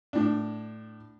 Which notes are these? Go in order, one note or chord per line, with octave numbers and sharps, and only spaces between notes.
A2 D4